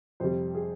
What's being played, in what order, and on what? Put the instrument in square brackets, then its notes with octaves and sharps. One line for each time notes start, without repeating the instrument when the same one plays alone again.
[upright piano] F2 C3 G3 C5
G#4